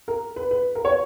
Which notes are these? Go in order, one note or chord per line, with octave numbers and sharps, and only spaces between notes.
A#4
B4
B4
A#4
C#5